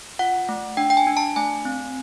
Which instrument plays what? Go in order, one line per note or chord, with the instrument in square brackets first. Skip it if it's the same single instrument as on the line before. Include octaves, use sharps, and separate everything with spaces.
[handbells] F4 F#5
A3
D4 G5
G5
G#5
D4
A5
A3 G#5
C4